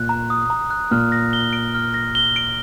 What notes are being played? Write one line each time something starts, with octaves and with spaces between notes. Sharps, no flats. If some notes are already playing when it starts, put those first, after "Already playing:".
Already playing: A#2 F#6
A#5
D#6
A#5
F#6
A#2 F6
A#6
G7
D7
F6
A#6
G7
D7